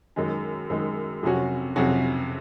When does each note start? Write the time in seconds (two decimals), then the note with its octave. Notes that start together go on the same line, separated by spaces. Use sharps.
0.16 F#2 D#3 G#3
0.70 F#2 D#3 G#3
1.23 F2 C3 F#3 C#4 F#4
1.76 F2 C3 F#3 C#4 F#4